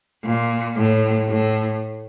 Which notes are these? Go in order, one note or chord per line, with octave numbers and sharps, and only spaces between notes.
A#2
A2
A2